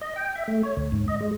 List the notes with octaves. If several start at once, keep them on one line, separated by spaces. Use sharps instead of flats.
D#5
G5
E5
A3
C#5
D2
G#2
D#5
G#3